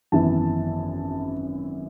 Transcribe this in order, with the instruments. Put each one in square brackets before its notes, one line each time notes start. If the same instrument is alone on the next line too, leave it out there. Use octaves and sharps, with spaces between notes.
[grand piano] G#1 F#2 E3 B3 E4 A5